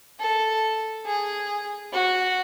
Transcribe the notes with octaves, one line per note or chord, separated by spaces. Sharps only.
A4
G#4
F#4